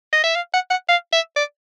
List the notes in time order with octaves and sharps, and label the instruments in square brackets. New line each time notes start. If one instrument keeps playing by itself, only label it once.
[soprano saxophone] D#5
E5
F5
F#5
F#5
F5
E5
D5